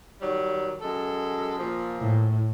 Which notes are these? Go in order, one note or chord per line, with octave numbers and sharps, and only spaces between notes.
D#3 F#3 G3
F#2 G#3 A4
A#2 F3
A2